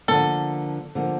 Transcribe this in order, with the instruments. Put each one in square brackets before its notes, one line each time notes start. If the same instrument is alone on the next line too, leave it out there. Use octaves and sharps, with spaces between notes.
[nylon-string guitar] D3 F3 A#3 [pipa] A4
[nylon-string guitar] D3 F3 A#3